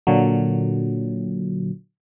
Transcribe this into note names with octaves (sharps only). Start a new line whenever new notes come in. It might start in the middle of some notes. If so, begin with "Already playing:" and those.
A#2 D3 F#3